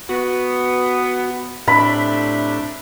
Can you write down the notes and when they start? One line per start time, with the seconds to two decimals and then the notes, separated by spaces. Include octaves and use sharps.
0.09 B3 F#4
1.68 A2 C3 A3 D4 B5